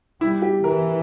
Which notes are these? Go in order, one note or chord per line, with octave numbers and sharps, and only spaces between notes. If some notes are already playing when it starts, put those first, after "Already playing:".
G3 E4
G4
E3 A#4